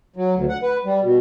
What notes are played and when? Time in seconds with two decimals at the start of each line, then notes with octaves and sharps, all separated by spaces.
0.16 F#3
0.34 D2
0.49 F#5
0.62 B4
0.85 G3
1.02 B2